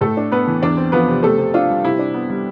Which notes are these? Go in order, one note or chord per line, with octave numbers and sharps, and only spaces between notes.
A2 A3 A4
D4
B3 B4
E3
E2 D4 D5
C4
F3 B3 B4
C3
C3 A3 A4
C3
D4 F4
G3
C3 E4
D4
B3
G3